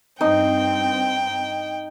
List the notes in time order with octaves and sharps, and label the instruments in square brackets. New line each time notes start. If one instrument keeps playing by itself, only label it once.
[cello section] G2 C4 [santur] D#4 [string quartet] G5